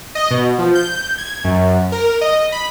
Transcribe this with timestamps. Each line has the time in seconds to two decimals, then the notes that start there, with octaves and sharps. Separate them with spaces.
0.15 D#5
0.31 B2
0.58 F3
0.75 G6
1.18 G#6
1.44 F#2
1.92 A#4
2.21 D#5
2.52 B5